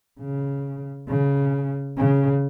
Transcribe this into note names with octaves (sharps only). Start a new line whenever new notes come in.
C#3
C#3
C#3